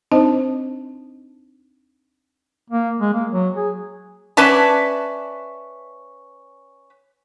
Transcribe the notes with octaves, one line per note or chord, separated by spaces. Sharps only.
C4 D4 D#4 C5 D#5 A5
A#3
G#3
A#3
F#3
G#4
C#4 B4 D5 E5 A5